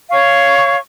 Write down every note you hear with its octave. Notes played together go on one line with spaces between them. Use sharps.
C#5 F5 C#6